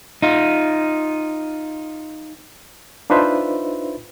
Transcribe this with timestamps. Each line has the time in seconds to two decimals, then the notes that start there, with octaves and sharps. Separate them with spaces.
0.22 D#4 F4
3.10 D4 D#4 F4 B4 C5 E5